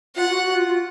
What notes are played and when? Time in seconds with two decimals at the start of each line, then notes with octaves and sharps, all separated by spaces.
0.16 F4 F#5
0.29 F#4
0.42 F#4
0.55 F4
0.68 F4